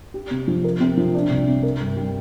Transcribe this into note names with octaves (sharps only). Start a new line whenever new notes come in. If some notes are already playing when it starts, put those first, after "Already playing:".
G4
C3
F3
A#4
C3
F3
D4
C2
C3
A#4
G2
G3